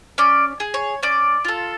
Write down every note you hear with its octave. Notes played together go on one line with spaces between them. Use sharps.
C#4 D5
G#4
C#5
C#4 D5
F4 A4